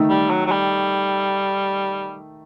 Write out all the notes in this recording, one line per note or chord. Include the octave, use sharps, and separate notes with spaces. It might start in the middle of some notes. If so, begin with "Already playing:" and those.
Already playing: D#3 A3 D#4 A4
G3
F#3
F#3
G3